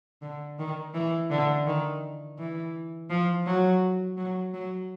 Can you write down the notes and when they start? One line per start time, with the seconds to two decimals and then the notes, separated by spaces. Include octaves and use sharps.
0.22 D3
0.59 D#3
0.94 E3
1.30 D3
1.67 D#3
2.38 E3
3.10 F3
3.46 F#3
4.17 F#3
4.54 F#3